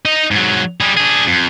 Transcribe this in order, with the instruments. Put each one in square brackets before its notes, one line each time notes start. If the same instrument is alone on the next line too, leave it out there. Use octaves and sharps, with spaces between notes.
[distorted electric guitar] D#4 D#5
G#2 F#3
G3 G#4
D4 G#4
F2